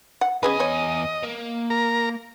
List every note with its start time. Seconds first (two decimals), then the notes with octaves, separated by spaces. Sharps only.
0.21 F#5
0.43 E2 C#4 G#4 B4 D#5 G#5
0.59 B3 C#5
1.23 A#3
1.70 A#4 A#5